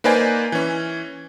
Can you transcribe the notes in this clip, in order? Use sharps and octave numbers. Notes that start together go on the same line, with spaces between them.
A#3 D#4 B4 C5 D5 G#5
E3 C#4